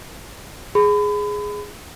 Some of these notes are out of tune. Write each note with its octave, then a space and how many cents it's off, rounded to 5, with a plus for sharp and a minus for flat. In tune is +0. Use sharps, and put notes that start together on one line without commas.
G#4 +0 B5 +30